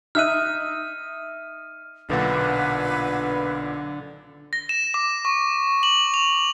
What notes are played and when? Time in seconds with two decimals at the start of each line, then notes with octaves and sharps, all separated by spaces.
0.15 D#4 E5 F6 F#6 D#7
2.10 B1 A#2 D3 B4 F#5
4.53 A#6
4.69 E7
4.94 D6
5.25 C#6
5.83 F#7
6.14 F7